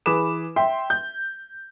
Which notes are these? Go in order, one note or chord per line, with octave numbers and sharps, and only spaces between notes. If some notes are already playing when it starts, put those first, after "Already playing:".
E3 G#4 B4 B5 D6 E7
E5 G5 C6
G6